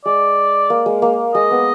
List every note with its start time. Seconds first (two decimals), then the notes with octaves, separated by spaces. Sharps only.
0.05 G#3 D5
0.70 A#3
0.86 G#3
1.02 A#3
1.34 G#3 D#5
1.51 B3